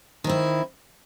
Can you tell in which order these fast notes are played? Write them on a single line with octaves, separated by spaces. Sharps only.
D#3 C4 E4